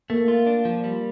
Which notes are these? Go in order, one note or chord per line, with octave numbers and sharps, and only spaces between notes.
A3 A#3
F4
D4
F3
G3